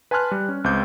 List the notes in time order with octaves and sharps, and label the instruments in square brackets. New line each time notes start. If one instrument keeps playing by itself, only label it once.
[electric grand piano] B4 G#5 A5 C6 F6 F#6
G3
C#4
C#2 C4 D6 G6